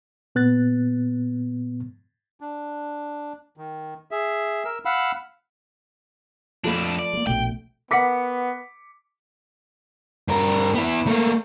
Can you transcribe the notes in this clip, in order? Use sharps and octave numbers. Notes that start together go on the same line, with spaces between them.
A#2 B3 F#6 A6
D4
D#3
G#4 E5
A#4 E6
F5 F#5 B5 E6
F2 F3 A3 D4 B5
D5
G#3 A#3
A#1 B2 A3 G5
B3 A#4 F#5 D6 B6 C#7
G2 A#4
B3 E4
A3 A#3